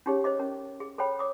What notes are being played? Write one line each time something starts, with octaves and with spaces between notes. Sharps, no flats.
C#4 D#4 G4 G#4 C#5
C5 C#5 D#5 D6
C#4 A#4
G#4
A4 C5 C#5 G5 B5
C#5 D6 D#6